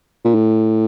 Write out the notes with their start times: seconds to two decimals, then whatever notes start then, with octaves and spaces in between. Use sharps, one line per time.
0.25 A#2
0.35 A2